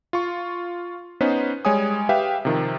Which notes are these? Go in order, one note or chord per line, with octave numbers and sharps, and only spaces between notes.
F4 C#6
B3 C#4 D#4 B4 C5
G3 G#3 C#5 G#5 D#6
G4 B4 E5 F5 G5
C3 D#3 F3